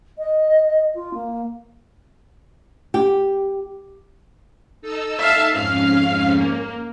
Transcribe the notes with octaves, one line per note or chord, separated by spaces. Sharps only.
D#5
F4
A#3
G4
D#4 A4 E6
E5 F5 A5
F2 G#2 C#4 F5
A#3